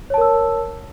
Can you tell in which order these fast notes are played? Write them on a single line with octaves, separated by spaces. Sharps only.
C#5 A5 A#4 E6